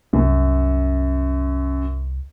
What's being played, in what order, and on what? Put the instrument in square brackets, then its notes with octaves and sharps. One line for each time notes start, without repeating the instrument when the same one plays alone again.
[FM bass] C2 [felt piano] F#2